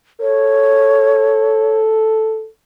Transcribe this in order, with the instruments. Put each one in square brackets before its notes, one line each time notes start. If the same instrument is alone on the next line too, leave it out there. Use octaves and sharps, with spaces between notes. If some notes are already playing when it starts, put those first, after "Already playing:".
[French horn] A4 [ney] C#5